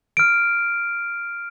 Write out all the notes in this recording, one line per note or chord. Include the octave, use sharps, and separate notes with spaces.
F6 D7